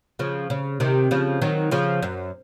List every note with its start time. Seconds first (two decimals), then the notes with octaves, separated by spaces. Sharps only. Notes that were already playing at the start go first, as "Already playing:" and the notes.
0.19 C#3 F3
0.50 C#3
0.80 C3 D#3
1.11 C#3 F3
1.42 D#3 F#3
1.71 C#3 F3
2.02 F#2